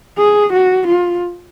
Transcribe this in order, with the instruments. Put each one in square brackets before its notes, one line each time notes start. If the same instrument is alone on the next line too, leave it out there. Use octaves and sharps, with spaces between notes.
[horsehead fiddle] G#4
F#4
F4